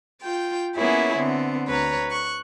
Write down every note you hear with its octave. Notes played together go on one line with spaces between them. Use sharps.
F4 G5 G6
A#3 B3 C#4 E4 G#4 C#5
D3 B3 C4
D2 B4 C#5 A#5
C#6 F#6